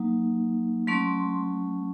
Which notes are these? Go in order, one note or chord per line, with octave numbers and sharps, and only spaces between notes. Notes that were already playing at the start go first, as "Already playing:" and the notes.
Already playing: F#3 A#3 D#4
F#3 A3 C#4 C6